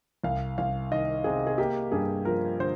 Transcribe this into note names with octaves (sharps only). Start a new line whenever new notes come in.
C2 F5
C2 F5
D#3 D#5
C3 G#4
G#4
A#3 G4
G2 G#4
F3 A#4
D3 C5